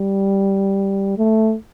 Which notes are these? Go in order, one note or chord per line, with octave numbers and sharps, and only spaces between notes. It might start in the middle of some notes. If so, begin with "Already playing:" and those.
Already playing: G3
A3